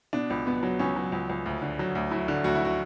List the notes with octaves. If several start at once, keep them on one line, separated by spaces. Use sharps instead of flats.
B2 D4
C#2
B2 B3
F#3
C#2 C#4
F#3
C#2
C#2
D2
D3
F#3
D2
F#3 E4
D3
D2 F#4
E4
F#4